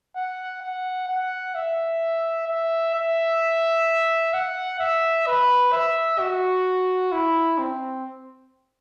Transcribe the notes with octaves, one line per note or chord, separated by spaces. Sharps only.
F#5
F#5
F#5
E5
E5
E5
F#5
E5
B4
E5
F#4
E4
C4